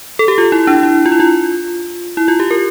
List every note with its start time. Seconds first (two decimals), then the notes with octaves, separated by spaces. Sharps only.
0.19 A4
0.28 G4
0.38 F4
0.52 E4
0.67 D4
0.83 E4
1.06 F4
1.12 E4
1.20 F4
2.17 E4
2.28 F4
2.40 G4
2.51 A#4